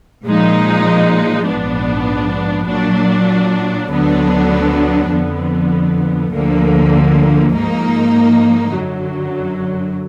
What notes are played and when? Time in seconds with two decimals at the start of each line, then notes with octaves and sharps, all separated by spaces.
0.25 A#2 F3 G#3 D#4
1.46 A#1 G#2 F3 B3 D4
2.67 A#2 F#3 D4
3.88 D2 D3 F#3 B3 D4
5.10 F2 D3 F3 B3
6.31 D2 D3 F3 A#3
7.53 G#2 F3 A#3 D#4
8.74 F#2 D3 F#3